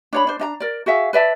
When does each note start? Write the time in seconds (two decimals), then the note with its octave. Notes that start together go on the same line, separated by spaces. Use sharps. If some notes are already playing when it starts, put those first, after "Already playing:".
0.13 D4 C#5 B5
0.27 D4 C5
0.39 D4 D#5 A#5
0.60 A#4 D5
0.86 F#4 G#4 E5 F5
1.13 B4 D5 E5 A5